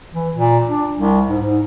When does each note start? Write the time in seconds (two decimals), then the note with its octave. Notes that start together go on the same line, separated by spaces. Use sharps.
0.12 E3
0.36 A#2
0.68 D4
0.96 C2
1.28 G#2
1.41 G#2